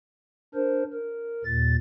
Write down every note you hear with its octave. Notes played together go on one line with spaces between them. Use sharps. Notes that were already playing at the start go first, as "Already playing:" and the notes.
D4 A#4 C5
A#4
D#2 A#2 A6